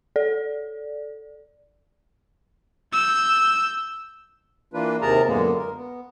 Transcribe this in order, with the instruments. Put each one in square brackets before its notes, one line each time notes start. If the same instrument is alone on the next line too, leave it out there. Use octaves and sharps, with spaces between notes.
[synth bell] A4 D5
[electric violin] E6 G6
[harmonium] E3 A#3 D4 F4 B4
D#2 C3 G#4 A#4 A5 A#5
F#2 A#2 D3 G#3 A#3 B3
A#4
B3